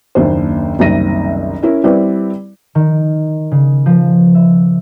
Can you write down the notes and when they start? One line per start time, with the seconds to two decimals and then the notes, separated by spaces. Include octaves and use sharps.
0.15 F#1 D#2 D4 C5
0.79 F#1 C2 D#3 C4 A#6 D#7
1.63 C#4 E4 A#4
1.84 G3 C4 E4 B4 D5
2.75 D#3
3.51 C#3
3.86 F3
4.35 E5